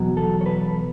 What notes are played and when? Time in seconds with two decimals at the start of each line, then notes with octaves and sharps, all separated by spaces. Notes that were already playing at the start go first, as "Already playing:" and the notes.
Already playing: E2 B2 F#3
0.17 A4
0.41 C#5
0.46 B4